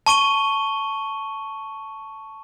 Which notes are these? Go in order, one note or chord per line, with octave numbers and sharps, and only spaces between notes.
A5 C#6 D#7 G7